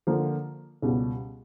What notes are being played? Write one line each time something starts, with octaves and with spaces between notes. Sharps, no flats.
D3 F3 A#3
C#2 B2 G3